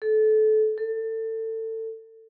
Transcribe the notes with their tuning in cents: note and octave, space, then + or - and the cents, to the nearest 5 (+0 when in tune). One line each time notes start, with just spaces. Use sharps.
A4 -25
A4 +25